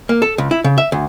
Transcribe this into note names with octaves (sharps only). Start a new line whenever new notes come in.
A#3
A4
C#2
E4
C#3
E5
D2